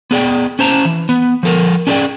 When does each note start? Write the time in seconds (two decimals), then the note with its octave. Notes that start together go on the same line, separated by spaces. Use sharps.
0.11 B3 G#4 D5 G5
0.59 C#4 C5 A5 A#5
0.85 E3
1.09 B3
1.43 F3 A4 A#4
1.87 C#4 D4 G#4 C#5 D5 G5